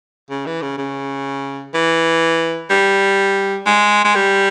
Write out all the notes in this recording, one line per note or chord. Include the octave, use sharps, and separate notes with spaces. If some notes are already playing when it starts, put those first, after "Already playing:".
C#3
E3
C#3
C#3
E3
G3
G#3
G#3
G3